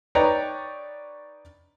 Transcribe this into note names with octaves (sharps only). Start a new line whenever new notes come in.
D#4 B4 C#5 D5 G5 A#5